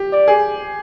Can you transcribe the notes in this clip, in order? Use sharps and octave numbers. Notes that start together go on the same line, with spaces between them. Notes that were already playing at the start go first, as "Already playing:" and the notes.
Already playing: G4
D5
G#4